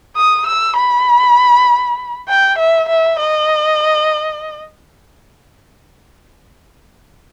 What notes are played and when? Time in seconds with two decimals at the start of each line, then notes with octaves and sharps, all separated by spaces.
0.16 D#6
0.47 E6
0.77 B5
2.29 G5
2.59 E5
2.89 E5
3.19 D#5